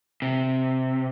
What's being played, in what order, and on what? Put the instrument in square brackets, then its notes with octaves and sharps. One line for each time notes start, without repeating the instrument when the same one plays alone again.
[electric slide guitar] C3